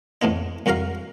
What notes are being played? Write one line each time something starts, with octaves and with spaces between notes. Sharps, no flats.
F2 A2 A3 B3 D#4
C2 F2 F#4 A#4 F5